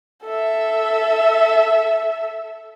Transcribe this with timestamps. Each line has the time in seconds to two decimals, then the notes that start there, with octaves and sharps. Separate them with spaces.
0.24 A4 E5